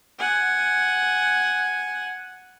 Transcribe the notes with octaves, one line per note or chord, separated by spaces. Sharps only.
F#5 G#5